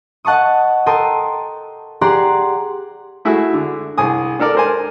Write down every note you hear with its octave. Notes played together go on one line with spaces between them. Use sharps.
D#5 F#5 A5 C#6 D#6
A4 A#4 G5 A5 C6 D#6
G4 G#4 D5 F#5 A#5 C6
A3 E4 F#4 G#4
D3
C2 G#4 G#5 D#6
D4 A4 A#4 D5
A#4 C5 G#5